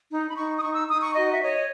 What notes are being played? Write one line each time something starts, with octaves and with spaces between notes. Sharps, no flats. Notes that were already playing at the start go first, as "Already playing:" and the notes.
D#4
B5
D#4 C#6
D#6
D#4 C#6
E6
D#4 D#6
C#6
F#4 D#5
E5
C#5 D#5